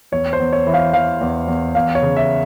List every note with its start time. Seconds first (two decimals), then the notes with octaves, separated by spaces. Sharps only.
0.12 E2 C#5
0.33 C5
0.40 E2
0.53 C#5
0.67 E3
0.74 F5
0.93 E3 F5
1.21 E2
1.48 E2
1.75 E2 F5
1.95 C#5
2.02 C#3
2.17 E5